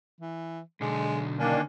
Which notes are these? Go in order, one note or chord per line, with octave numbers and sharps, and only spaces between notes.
E3
B1 D3 G#3
D#3 A#3 C#4 D4